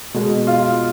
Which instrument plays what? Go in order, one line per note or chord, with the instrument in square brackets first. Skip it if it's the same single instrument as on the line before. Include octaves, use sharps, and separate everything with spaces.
[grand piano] B2 G#3
F4